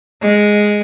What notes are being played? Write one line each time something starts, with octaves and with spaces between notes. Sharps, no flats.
G#3